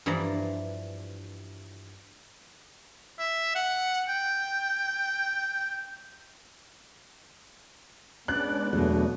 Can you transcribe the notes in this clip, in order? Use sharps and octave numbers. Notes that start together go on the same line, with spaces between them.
G2 E3 F3 D5 A#5
E5
F#5
G5
G#3 B3 C#4 D4 D5 F#6
E2 B2 F#3 A3 D4